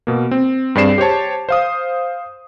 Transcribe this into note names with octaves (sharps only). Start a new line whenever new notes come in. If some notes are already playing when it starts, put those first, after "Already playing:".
B2 A#3
C4
G2 C4 G#4 D5 C7 E7
G4 C5 C#5 A5
C5 F5 D#6